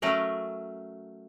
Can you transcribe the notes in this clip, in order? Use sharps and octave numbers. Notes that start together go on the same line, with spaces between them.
F#3 A3 C#4 A#4